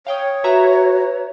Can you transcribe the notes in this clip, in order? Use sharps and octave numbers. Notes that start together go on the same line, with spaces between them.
C#5 F5 G5 D#6
F#4 B4 E5 A#5